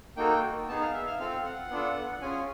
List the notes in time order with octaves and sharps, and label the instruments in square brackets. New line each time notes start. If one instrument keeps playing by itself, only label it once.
[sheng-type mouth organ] A#3 D#4 F#4 A4 G5
B3 D#4 G#4 A5
F5
E5
F5
C4 F4 A4 F5
F#5
B3 D4 F4 A4
C#4 F4 G#4 G#5